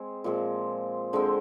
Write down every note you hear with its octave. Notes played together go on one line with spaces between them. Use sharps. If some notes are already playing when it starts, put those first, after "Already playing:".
Already playing: G#3 C4
A#2 F3 G#3 C4
D3 G#3 C4